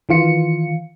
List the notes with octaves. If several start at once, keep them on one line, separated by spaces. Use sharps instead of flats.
D#3 E3 F4 C#7